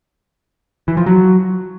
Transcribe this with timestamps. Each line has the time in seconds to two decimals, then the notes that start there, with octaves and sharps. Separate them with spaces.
0.88 E3
0.97 F3
1.06 F#3